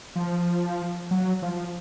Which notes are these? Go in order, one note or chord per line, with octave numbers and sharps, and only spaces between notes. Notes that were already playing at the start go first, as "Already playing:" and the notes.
F3
F#3
F3